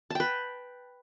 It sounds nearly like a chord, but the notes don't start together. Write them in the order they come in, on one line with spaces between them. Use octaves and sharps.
A5 G5 B4